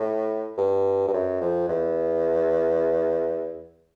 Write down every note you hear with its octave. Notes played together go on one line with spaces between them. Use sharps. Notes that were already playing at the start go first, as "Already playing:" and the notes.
Already playing: A2
G2
G2
F#2
F2
E2